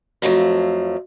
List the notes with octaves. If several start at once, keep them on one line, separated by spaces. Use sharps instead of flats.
F2 F3 F#3 A3